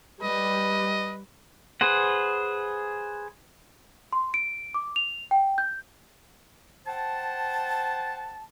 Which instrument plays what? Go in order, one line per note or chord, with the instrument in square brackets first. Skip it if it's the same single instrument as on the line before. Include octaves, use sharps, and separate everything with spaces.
[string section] G3 [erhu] B4 [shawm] D#5
[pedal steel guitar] G#4 B4 C5 F#5
[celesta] C6
D7
D6
F7
G5
G6
[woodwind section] C5 F#5 G5 A5